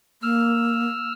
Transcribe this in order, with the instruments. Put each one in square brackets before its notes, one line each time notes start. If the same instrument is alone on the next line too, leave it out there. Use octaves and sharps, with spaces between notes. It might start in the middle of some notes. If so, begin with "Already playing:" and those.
[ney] A#3 [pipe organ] E6 F6